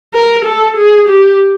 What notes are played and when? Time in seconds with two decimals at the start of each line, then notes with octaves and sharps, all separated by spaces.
0.14 A#4
0.45 A4
0.76 G#4
1.08 G4